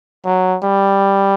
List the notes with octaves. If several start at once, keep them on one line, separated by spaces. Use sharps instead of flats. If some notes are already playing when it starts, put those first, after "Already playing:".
F#3
G3